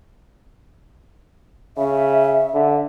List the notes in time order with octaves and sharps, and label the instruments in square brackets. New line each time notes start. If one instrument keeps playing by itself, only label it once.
[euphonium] C#3 [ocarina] E5
[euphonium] D3